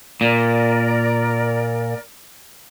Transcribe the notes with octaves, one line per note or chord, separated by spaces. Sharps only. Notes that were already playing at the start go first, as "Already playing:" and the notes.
A#2 A#4 D5